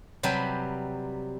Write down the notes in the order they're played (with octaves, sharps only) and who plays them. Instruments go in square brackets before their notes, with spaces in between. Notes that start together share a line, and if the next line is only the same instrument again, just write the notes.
[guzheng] C3 F#3 G3 B4 G5 A5